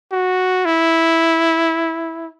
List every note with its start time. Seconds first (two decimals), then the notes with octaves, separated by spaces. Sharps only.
0.12 F#4
0.65 E4